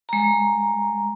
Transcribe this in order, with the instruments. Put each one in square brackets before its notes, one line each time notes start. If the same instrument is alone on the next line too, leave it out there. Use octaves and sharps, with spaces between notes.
[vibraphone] G#3 A#5